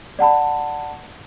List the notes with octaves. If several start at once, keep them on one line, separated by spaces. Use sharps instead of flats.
D5 F#5 A5 B5